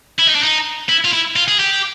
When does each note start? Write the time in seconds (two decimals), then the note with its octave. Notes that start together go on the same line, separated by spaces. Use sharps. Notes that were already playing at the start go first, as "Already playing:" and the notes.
0.19 E4
0.27 D#4
0.35 D4
0.43 D#4
0.89 E4
1.05 F4
1.13 E4
1.36 F4
1.48 G#4
1.59 G4